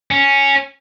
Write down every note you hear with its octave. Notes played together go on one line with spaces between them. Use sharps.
C#4